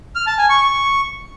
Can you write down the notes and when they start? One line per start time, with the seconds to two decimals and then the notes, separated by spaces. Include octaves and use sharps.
0.15 F6
0.27 A5
0.38 G#5
0.50 C#6
0.61 C#6